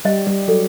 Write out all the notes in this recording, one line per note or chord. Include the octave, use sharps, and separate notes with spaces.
G3 D#5
G3
F#3 A4